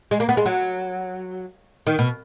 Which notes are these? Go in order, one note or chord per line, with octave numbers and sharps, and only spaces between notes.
G#3
A#3
B3
G#3
F#3
D#3
B2